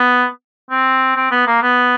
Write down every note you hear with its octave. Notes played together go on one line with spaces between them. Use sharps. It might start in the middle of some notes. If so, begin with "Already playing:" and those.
Already playing: B3
C4
C4
B3
A#3
B3